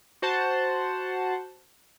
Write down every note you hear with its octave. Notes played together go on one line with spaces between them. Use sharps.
F#4 C5 F#5 A5